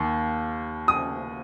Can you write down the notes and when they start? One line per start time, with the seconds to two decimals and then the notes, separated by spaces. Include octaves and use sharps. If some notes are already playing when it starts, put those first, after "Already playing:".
Already playing: D#2 D#3
0.88 D#6